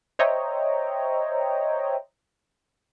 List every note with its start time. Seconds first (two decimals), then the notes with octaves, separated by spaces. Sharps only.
0.19 C5 C#5 D#5 E5 G5 A#5